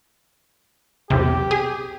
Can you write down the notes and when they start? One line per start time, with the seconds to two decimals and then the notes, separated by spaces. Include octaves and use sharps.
1.10 B1 E2 C3 G4
1.51 G#4